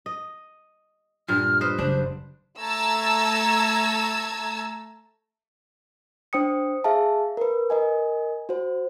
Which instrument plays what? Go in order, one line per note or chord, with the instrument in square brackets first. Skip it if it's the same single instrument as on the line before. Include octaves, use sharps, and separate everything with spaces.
[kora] D#5
[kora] G2 A#2 [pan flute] F6
[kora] B4 C5 D#5
[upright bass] F#1 [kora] D4 [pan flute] C5
[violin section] A3 A5 A#5 E6 G#6
[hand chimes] D4 C5 G5 D#6 C#7
G#4 E5 F5 A5
A#4 B4
A#4 D#5 G#5
F#4 C5